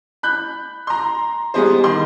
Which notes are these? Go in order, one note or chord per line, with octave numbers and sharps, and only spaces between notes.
B5 F#6 G6
A#5 C6
G3 G#3 B3 G4 G#4 C5
D#3 C6